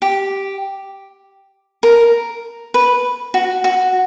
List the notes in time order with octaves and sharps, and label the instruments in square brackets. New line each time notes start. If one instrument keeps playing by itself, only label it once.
[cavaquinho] G4
A#4
B4
F#4
F#4